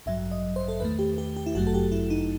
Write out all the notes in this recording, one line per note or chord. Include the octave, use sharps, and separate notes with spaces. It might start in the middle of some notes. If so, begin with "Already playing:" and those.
A1 G2 F#3 E5
D#5
C5
A4
E2 D#3 A3 B4
G4
G4
G4
E4
G1 F#2 F#3 A3 F#4
A4
G4
E4
D#4